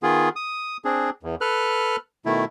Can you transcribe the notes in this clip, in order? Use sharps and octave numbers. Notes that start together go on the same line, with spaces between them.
D#3 B3 F4 G#4
D#6
C4 D4 G#4
E2
A4 B4 F6 F#6
B2 D#3 A3 E4